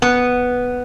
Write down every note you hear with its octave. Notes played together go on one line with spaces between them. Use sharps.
B3